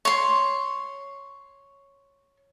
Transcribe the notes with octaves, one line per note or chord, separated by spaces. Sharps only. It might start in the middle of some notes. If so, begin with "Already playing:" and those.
C#5 C6